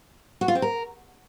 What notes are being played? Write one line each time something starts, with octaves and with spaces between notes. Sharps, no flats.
F#4
F4
C4
A#4